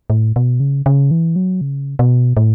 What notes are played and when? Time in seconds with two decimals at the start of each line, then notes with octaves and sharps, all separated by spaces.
0.10 A2
0.36 B2
0.60 C#3
0.86 C#3
1.11 E3
1.36 F#3
1.61 C#3
1.99 B2
2.37 A2